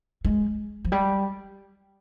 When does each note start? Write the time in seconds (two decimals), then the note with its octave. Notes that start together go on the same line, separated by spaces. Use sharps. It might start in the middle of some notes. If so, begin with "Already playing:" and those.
0.25 G#3
0.85 F3
0.92 G3